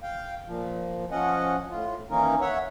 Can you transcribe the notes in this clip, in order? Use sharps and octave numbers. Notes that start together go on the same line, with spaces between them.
F5 G5
A#2 F3
F3 C#4 D#5 F#5
A2 F4
D#3 E3 A#3 C#4 D#4 A#4
C#5 E5 F#5